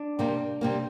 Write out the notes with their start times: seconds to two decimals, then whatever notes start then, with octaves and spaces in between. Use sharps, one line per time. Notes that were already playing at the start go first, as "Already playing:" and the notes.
Already playing: D4
0.19 C3 G3 A#3
0.61 C3 G3 A#3